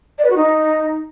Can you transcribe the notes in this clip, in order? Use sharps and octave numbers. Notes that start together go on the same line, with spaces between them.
D5
B4
F#4
D#4